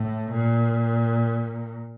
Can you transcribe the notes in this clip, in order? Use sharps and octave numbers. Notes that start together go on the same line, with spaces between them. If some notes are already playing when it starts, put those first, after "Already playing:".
Already playing: A2
A#2